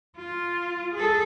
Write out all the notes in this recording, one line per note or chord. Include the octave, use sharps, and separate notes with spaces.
F4
G#4 A4